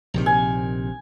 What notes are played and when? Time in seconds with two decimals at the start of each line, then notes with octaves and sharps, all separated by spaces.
0.14 A#1 C3 D#3
0.26 G#5